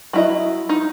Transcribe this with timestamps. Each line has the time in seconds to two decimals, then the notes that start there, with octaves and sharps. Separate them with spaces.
0.13 F#3 E4 D#5
0.69 D#4